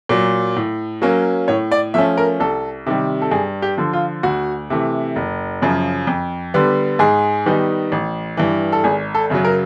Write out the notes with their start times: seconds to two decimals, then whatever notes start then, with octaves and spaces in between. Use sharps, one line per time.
0.09 A#2 F#3
0.56 A2
1.02 F#3 A#3 C#4
1.48 A2 C#5
1.72 D5
1.94 F3 A3 C#4 E5
2.18 A#4
2.40 C2 A4
2.86 C3 D#3 G3
3.22 A4
3.31 G2 G#4
3.62 G4
3.78 D3 F3
3.93 F4
4.23 D2 F#4
4.70 C3 E3 A3
5.16 F#1
5.62 F#2 C#3 F3
6.07 F2
6.54 D3 G3 B3
6.99 G#2 G#4
7.46 D#3 G3 B3 D#4
7.92 A1
8.37 G2 E3
8.72 A4
8.84 G#1 G#4
9.15 A4
9.30 F#2 C#3 F#3
9.45 A#4